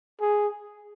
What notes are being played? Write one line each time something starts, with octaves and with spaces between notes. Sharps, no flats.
G#4